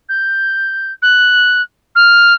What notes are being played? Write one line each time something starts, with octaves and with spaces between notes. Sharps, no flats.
G6
F#6
F6